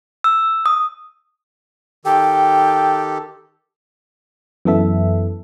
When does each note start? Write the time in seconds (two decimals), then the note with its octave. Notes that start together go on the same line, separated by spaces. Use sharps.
0.24 E6
0.66 D#6
2.05 D#3 G4 A4 G5
4.65 F#2 E3 B3 A4 E5